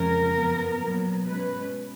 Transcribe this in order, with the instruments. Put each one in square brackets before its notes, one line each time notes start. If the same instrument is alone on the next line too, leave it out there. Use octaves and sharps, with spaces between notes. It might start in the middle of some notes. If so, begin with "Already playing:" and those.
Already playing: [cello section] F2 C#3 F3 G#3 C#4 A#4
F#2 F3 B3
A#2 F#3 B3
B2 G#3 C#4 B4